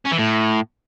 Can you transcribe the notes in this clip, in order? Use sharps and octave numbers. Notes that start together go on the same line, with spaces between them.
C#4
E3
A2